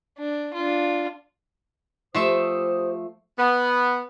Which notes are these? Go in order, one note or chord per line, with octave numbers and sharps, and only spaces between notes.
D4
D4 F4
F3 A3 G4 C5 E5 D#6
B3